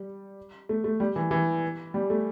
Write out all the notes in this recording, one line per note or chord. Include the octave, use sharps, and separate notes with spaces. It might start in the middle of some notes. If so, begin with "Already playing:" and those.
Already playing: G3
A3
A3
G3
E3
E3
G3
A3